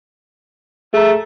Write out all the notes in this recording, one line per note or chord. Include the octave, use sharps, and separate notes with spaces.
A3 G#4 A#5